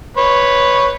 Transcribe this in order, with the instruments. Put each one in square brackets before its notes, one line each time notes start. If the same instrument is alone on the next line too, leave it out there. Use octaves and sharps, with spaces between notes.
[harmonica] B4 C#5